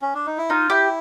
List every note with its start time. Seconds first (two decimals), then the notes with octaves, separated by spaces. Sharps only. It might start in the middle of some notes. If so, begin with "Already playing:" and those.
0.02 C#4
0.15 D4
0.26 D#4
0.38 E4
0.50 D#4 F4
0.70 E4 G4